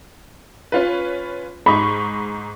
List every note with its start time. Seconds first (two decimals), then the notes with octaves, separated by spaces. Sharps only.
0.72 C#4 F4 B4
1.66 G#2 D#4 B5 C#6